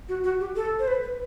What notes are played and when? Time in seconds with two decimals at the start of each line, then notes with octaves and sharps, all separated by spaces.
0.09 F#4
0.24 F#4
0.40 G4
0.56 A4
0.79 C5
0.88 B4
1.03 B4